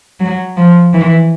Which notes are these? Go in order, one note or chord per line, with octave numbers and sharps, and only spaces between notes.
F#3
F3
E3